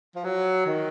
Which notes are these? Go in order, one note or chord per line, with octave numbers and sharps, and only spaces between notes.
F3
F#3
D#3